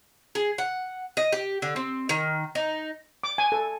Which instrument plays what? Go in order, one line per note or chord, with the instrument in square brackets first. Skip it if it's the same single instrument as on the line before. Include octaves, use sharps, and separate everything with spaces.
[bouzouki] G#4
F#5
D#5
G4
D3
C4
D#3
D#4
[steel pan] D6
G#5
A4